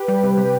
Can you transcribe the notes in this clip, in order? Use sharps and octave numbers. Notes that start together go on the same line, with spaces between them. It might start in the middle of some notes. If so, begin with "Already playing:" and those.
Already playing: G4 B4
G3
C3
C3